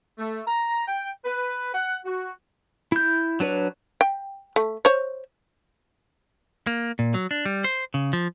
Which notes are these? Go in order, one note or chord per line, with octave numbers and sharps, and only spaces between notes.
A3
A#5
G5
B4
F#5
F#4
E4 G6
F#3 D4 B4 C#5
G5
A3
C5 C#5
A#3
A#2
F#3
D4
G3
C5
C#3
F3